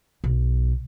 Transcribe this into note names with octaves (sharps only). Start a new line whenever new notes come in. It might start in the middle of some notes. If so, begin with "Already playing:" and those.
B1